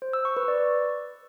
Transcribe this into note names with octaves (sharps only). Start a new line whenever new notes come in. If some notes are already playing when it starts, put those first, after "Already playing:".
C5
E6
C#6
B4
D5